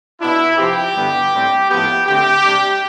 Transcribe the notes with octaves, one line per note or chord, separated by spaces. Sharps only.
B2 B3 D4 E4
C3 F3 C4 G4
G2 D3 G3 B3
A2 G3 C4
A2 F3 B3 G4
D3 A3 C4 G4
C3 G3 D4